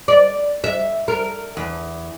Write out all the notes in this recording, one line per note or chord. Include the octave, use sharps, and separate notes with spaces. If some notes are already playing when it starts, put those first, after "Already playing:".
D5
E5
A#4
E2